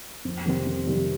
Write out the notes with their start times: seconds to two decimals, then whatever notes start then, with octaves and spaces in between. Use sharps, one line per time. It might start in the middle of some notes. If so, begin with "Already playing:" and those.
0.25 F2
0.45 C3 D#3 G3 C4
0.66 F2
0.87 C3 D#3 G3 C4